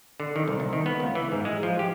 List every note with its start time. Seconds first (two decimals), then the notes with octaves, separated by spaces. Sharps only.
0.20 D3
0.36 D#3
0.48 C2
0.60 C2
0.73 D#3
0.86 B3
1.00 C#2
1.15 E3
1.32 G#2
1.45 G#3
1.63 F3
1.79 G4